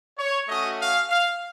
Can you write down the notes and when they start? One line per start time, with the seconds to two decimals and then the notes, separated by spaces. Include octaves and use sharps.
0.18 C#5
0.48 A3 C#4 F#4 D#5
0.78 F5
1.09 F5